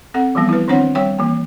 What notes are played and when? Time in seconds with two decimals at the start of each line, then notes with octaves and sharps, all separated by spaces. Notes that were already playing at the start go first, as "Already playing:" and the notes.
0.14 C4 A4 F#5
0.35 E3 F3 G3 B3
0.49 E4 B4
0.68 D#3 C4 D4 C5 C#5 F#5
0.95 G3 C#5 G5
1.19 E3 A#3